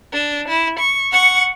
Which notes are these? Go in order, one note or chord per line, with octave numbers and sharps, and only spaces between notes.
D4
E4
C#6
F#5 C#6